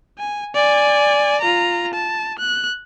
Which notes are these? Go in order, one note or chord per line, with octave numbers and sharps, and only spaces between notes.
G#5
D5 G#5
F4 A#5
A5
F#6